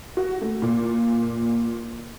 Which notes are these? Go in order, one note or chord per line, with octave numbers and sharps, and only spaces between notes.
F#4
A3
A#2